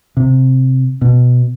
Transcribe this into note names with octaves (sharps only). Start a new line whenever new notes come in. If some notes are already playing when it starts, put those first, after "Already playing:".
C3
B2